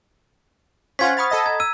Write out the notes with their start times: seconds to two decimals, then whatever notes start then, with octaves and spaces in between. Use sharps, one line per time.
0.99 C#4 F4 C5 F#5 G#6 B6
1.17 F#5 B5 C#6 D#6 F6 A6
1.30 A4 D#5 A6
1.46 A#5 G#6
1.60 E6 D#7